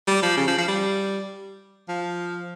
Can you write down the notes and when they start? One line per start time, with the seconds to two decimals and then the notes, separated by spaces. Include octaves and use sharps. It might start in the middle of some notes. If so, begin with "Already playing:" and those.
0.07 G3
0.22 F3
0.37 C#3
0.48 F3
0.58 F3
0.67 G3
1.89 F3